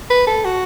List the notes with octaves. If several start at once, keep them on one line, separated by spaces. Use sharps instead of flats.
B4
A4
F#4